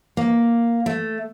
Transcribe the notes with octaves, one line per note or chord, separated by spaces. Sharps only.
A#3
A3